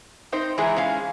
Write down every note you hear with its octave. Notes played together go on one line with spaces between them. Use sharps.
C4 D#4 C5
E3 G#3 D#4 E4 G#4
C#4 F5